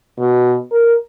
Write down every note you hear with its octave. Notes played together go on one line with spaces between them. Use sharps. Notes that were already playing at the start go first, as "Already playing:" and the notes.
B2
A#4